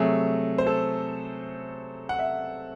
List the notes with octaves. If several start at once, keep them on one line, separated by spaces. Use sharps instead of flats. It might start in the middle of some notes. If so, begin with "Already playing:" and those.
Already playing: C3 F#3 A3 G#4
C5
A4
F#5
E5